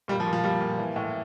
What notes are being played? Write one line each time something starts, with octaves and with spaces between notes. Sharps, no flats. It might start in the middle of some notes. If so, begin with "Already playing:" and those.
A#2 G3
F3
A#2
F3
A#2 G3
A#2
E3
A2